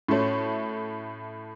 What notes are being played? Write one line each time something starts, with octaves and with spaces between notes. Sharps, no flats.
A2 A3 C#4 F#4 C#5